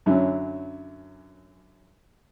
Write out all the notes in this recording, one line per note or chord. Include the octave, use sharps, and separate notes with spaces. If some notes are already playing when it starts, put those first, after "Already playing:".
F#2 D3 F#3 C#4 D4 E4